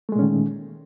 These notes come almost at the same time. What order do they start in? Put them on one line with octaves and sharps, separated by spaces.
A3 G#3 A#2 C#4 D#3